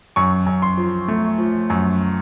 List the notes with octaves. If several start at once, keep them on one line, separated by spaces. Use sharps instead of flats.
F#2 C#6
F#2
C6
F3
A3
F3
F#2